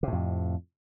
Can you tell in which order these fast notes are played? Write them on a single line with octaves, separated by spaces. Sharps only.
C3 A2 F2